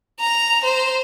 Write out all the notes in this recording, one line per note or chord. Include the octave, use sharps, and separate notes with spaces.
A#5
C5